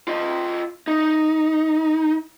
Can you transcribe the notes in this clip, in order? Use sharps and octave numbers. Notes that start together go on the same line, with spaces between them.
F4 D#5
D#4